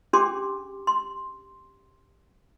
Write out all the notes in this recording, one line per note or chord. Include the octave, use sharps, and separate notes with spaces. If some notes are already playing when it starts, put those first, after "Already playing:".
C#4 D4 G4 G#4 C6 D6
C6